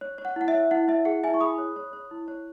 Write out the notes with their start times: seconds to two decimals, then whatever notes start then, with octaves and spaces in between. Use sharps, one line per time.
0.01 C#5
0.18 C#5
0.25 F#5
0.36 E4 F#5
0.48 E5
0.54 C#5
0.71 E4 F#5
0.88 E4 E5
1.05 G#4 F#5
1.23 E4 E5 G#5
1.34 C#6
1.41 G#4 B5 D#6
1.58 C#5
1.76 C#5
1.93 C#5
2.11 E4
2.28 C#5